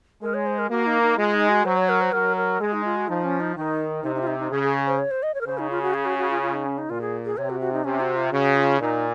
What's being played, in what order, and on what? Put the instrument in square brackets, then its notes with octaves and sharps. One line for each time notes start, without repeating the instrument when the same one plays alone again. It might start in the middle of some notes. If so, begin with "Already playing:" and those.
[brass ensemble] G#3 [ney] A#4
[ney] C#5
C5
A#4
[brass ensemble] A#3 [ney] F#4
[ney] D#4
D#4
[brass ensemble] G#3 [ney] F4
[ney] D#4
F#4
[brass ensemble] F#3 [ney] C5
[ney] C#5
A#4
C5
[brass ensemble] F#3 [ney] A#4
[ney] A#4
[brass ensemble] G#3 [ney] G#4
[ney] D#4
F4
F#4
[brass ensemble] F3 [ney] D#4
[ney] C#4
D#4
[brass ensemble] D#3 [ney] D#4
[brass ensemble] C3 [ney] D#4
[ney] D#4
F4
D#4
D#4
[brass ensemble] C#3 [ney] G#4
[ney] G#4
C5
C#5
C5
D#5
C#5
A#4
[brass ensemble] C#3 [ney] C5
[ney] D#4
F4
F#4
G#4
F#4
F#4
F4
F4
D#4
C#4
D#4
[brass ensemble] A#2 [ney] F4
[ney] G#4
G#4
[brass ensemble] C3 [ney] C#5
[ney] F#4
F#4
D#4
[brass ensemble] C3 [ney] C#4
[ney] F#4
F4
[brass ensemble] C#3 [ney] F#4
[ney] F4
[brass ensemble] A#2 [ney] D#4